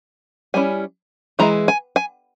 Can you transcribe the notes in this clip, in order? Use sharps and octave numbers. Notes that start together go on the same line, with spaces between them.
G3 C#4 E4 G#5
E3 G#3 E4 A#5
G#5
G#5